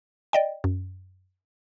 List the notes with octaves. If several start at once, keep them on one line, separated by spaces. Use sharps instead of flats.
D5 D#5 G5
F#2